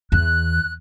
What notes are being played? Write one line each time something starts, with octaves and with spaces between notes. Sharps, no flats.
E2 F#6